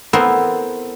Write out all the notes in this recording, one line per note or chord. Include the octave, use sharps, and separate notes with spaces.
B3 C4 E4 A4 A#4 C5